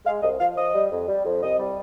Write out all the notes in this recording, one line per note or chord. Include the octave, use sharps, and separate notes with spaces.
G#3 F5
C2 D#5
F3 F5
F3 D#5
G3
F2
G3
F2
C2 D#5
G3